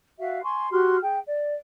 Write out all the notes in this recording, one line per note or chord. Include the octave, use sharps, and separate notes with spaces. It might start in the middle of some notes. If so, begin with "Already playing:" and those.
F#4 E5 F5
G#5 C6 C#6
F#4 G4 C6 F6
G#4 G5
D5